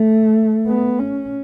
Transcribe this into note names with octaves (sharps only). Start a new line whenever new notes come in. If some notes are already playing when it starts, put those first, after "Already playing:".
Already playing: A3
B3
C#4